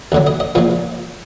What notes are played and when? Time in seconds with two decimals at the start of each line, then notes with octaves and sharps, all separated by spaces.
0.12 D2 D3 F#3
0.27 D#5
0.40 D#5
0.55 A#2 F3 G#3